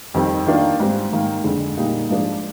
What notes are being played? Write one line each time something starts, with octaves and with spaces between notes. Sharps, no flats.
F2 D#3 G3 C4
D#3 A#3 D4 F4
G#2 G3 C4
G#2 D#3 A#3
F2 D3 G#3
A#2 G3 A#3 D#4
G#2 F3 G#3 D4